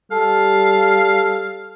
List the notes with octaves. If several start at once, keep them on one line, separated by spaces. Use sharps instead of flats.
G3 A4 F5